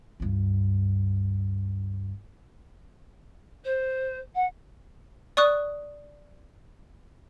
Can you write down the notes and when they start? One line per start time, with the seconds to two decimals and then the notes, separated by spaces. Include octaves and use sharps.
0.20 C#2 G2
3.64 C5
4.34 F#5
5.37 D5 C#6 D#6 F#6